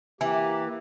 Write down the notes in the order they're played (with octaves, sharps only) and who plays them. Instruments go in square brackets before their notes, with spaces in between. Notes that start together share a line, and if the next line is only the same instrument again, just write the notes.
[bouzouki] E3 [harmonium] A#3 G4